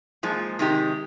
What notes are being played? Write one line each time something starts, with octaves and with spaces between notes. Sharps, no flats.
A#2 F3 G#3
C3 D#3 G#3 D#4 G4